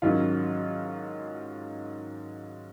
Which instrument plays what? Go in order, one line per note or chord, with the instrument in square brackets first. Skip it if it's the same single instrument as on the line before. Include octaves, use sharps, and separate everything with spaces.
[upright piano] G#2 D#3 F#3 C#4 F4